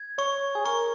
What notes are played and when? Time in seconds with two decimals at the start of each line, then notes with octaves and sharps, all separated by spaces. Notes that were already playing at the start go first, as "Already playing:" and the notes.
Already playing: G#6
0.18 C#5 C#6
0.55 G#4
0.65 A#4 C#6